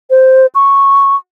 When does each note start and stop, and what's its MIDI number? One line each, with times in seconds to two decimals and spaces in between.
0.10 0.46 72
0.55 1.16 85